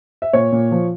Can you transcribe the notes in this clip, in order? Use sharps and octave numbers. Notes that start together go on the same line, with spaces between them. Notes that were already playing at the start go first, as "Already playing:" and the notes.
E5
A#2 C#5
A#2
F3